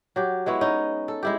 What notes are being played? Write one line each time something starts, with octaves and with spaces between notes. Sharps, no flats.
F#3 G4
G#3 B3 E4 C#5
C#4 D#4
A4
G#3 E4 G4